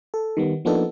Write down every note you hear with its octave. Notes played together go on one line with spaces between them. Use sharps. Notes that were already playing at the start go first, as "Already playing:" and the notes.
A4
D#3 G3 B3
F3 A#3 B3 D4 D#4 A4